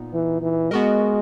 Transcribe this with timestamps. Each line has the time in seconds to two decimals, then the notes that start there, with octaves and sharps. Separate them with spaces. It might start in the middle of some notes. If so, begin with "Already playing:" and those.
Already playing: A#2 B3 D#4
0.14 E3
0.42 E3
0.71 G#3 B3 F#4 A#4 D#5